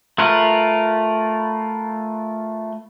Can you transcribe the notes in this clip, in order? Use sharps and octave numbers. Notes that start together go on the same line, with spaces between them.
A3 F4 A#4 B4